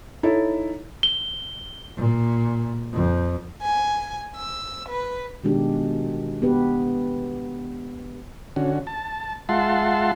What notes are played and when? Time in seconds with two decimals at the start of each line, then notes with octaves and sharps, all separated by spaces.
0.23 D#4 E4 A4 C#5
1.03 G7
1.97 A#2
2.93 F2
3.62 G#5
4.36 E6
4.89 B4
5.44 B2 D#3 G#3 D4 G4
6.42 B3 G4 B4
8.56 D3 C#4 F#4
8.87 A5
9.49 G#3 F4 E5 F#5 A5 C6